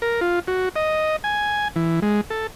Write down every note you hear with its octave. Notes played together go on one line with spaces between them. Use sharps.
A#4
F4
F#4
D#5
G#5
E3
G#3
A4